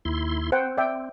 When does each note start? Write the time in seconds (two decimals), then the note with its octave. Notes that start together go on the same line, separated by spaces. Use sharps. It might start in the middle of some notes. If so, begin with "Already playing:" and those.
0.05 D#2 E4 C6
0.52 C4 C5 F#5 G5
0.77 D5 E5 G5